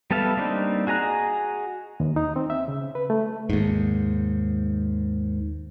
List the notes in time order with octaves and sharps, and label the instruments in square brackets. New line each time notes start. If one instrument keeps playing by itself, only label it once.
[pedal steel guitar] G3 B3 A4 E5 F5
G3 A#3 C4 D4 D#4
F#4 G#4 D#5 A#5 F#6
[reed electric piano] D#2
D#4
C4
E5
C#3
B4
A3
[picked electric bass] D#2 G#2